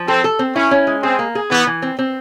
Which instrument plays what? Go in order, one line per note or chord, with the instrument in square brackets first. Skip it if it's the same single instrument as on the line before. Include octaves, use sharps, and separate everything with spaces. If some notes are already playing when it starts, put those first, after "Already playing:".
Already playing: [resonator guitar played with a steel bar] F3
[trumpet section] C4 [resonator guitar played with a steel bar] A4
[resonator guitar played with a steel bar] A4
C4
[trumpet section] C#4 [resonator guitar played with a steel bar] E4
[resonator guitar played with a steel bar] C#4
G#3
[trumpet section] C4 [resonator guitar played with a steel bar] G#4
[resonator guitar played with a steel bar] A#3
G#4
[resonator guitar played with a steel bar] E3 [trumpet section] B3
[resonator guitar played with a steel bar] E3
C4
C4